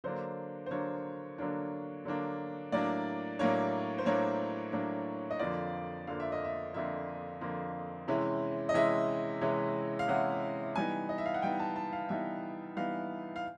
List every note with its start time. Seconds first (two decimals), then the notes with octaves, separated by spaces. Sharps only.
0.04 D3 F#3 A#3 D4 C5
0.66 C5
0.71 D3 F#3 A#3 D4 C#5
1.38 D3 F#3 A#3 D4
2.05 D3 F#3 A#3 D4
2.72 A2 F#3 A#3 D4 D5
3.39 A2 F#3 A#3 D4 C#5
3.98 C5
4.06 A2 F#3 A#3 D4 C#5
4.72 A2 F#3 A#3 D4
5.31 D#5
5.39 F2 D3 F3 A#3 D5
6.07 F2 D3 F3 A#3 F5
6.20 E5
6.32 D#5
6.44 E5
6.74 F2 D3 F3 A#3 E5
7.41 F2 D3 F3 A#3
8.08 C3 E3 G#3 C#4 E4
8.69 D#5
8.74 C3 E3 G#3 C#4 E4 E5
9.41 C3 E3 G#3 C#4 E4
9.99 F5
10.08 C3 E3 G#3 C#4 E4 F#5
10.76 E3 G3 B3 D#4 G#5
11.09 D#5
11.18 E5
11.26 F5
11.34 F#5
11.42 E3 G3 B3 D#4 G5
11.59 A5
11.76 A5
11.93 F5
12.09 E3 G3 B3 D#4 E5
12.76 E3 G3 B3 D#4 F5
13.36 F5